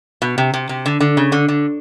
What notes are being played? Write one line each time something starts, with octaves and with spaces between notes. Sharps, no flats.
B2
C3
C3
C3
D3
D3
C#3
D3
D3